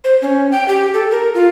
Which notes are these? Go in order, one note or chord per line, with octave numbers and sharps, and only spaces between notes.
C5
C#4
G5
G4
A4
A#4
F4